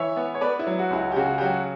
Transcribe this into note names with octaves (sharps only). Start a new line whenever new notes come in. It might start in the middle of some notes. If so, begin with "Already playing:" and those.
Already playing: E3 C#5 E5
B3
C#5
B3 B4 D5
E4
F#3
F#4
C#2 E4
F#4
G4
C#3 F#4
G4
F#3 F#4